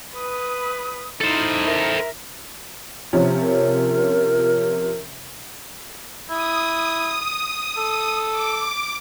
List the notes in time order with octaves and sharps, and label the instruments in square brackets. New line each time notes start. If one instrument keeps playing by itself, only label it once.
[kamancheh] B4 [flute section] B5 D#6
[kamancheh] D#4 E4 [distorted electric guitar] A4 C5
[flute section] A#4 E5
[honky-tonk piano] C3 F3 C#4
[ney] A#4
[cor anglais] E4 [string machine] D#6
[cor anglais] A4
[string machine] D6